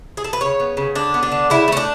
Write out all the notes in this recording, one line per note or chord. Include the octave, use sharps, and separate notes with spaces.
G#4
A4
B4
C#3 C#5
B3
C#3
D3 D4
B3
D4
D3
C#3 E4
A3 C#4
D4